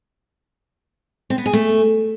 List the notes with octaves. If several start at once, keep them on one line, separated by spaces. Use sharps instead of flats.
C4
B3
G#4
A3